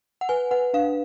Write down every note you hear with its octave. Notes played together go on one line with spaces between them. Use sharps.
F#5
B4 G#5
B4 F#5
D4 F5